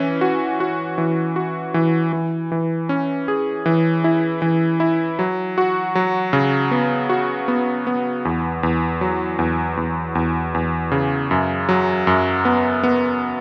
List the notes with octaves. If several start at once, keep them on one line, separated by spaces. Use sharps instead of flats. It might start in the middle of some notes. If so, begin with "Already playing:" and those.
Already playing: E3 C#4
F#4
F#4
E3
F#4
E3
E3
E3
C#4
G#4
E3
E4
E3
E4
F#3
F#4
F#3
C#3
B3
F#4
B3
B3
E2
E2
F#3
E2
E2
E2
E2
C#3
F#2
F#3
F#2
B3
B3